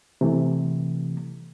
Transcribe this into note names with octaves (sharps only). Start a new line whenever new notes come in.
C3 E3 A3